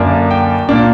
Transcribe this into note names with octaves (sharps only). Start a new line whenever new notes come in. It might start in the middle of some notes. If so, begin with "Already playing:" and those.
Already playing: F#2 D3 A#3 D4
G5
A#2 A#3 D4